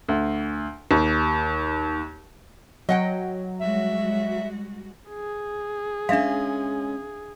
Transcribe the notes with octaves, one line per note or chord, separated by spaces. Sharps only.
D2
D#2
F#3 D#5 F#5 G5
G3 G#3 F#4 E5
G#4
G#3 C#4 D4 E5 F5